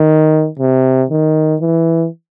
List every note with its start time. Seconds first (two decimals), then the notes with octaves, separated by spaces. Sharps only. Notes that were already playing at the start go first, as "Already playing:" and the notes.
Already playing: D#3
0.59 C3
1.10 D#3
1.61 E3